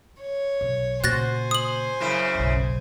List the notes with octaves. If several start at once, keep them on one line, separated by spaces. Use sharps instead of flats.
C#5
B1
A#2 C#3 F#4 C5 G#5 F#6 A6 A#6
D#6 F#7
F#2 C#3 E4
F#1 B1